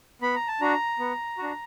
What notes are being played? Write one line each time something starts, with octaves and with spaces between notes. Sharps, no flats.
B3 B5
A#5
A5
D4 F#4 A#5
B3
D4 F#4